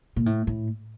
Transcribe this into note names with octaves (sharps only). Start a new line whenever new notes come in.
A#2
A2
A2